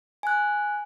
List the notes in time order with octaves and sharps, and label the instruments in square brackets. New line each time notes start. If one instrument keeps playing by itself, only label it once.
[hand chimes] G#5 F#6